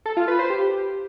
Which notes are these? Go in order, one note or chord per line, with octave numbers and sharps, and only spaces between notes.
A4
F4
B4
C5
G4